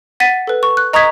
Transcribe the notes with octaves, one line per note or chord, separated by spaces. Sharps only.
F#5 A6 B6 D#7
A4 B4
C#6
F#6
D#5 A#5 C#6 D#6 G#6 B6